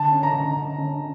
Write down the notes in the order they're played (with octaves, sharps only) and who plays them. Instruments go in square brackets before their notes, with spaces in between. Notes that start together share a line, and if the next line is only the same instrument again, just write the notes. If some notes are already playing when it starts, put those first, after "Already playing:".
Already playing: [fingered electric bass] D3 [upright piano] A5
[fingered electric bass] C#4
[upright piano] A#5
[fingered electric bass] D3
D3
C#4